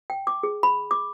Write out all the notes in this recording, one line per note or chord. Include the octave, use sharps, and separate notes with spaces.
G5
D6
G#4
B5
D6